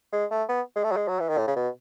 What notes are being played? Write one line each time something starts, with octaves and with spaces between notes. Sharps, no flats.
G#3
A3
B3
G#3
A3
F#3
G#3
F#3
E3
D#3
A2
C#3
B2